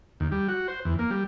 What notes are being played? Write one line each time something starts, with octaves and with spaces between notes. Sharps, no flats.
D#2
G3
F#4
C5
E2
A#3
G3